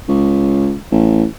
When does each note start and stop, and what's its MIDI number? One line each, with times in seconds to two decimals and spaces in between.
0.08 0.74 37
0.92 1.25 33